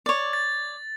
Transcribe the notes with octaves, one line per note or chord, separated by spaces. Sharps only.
C#5 D5
A6